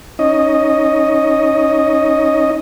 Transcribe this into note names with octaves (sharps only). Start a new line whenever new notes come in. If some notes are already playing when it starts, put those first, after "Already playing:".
C#4 D#4 D#5